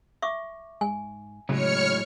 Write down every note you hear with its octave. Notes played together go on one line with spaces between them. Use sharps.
E5 C#6 D6
G#2 G#5
A2 C#3 F#3 G#3 C#5 C#6 F6